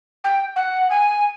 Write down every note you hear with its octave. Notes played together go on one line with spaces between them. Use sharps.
G5
F#5
G#5